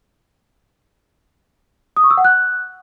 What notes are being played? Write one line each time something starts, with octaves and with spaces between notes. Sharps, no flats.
D#6
C#6
E6
F#5
F#6